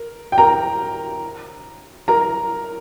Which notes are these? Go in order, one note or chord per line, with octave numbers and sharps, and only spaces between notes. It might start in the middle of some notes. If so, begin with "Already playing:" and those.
Already playing: A#4
G5
A#4 A#5
A#4 A#5